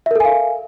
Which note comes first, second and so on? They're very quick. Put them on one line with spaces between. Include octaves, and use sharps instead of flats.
E5 A#4 A4 G#5 F5